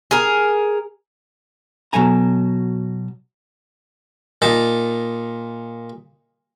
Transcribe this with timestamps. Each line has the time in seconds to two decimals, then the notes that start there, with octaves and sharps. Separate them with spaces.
0.11 G#4 A#4
1.93 B2 F#3 A4 G#5 A#5
4.42 A#2 D#4 A5